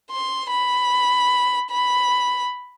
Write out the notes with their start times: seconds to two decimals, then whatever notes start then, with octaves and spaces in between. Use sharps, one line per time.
0.11 C6
0.51 B5
1.71 B5